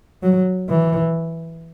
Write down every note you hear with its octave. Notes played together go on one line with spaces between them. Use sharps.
F#3
E3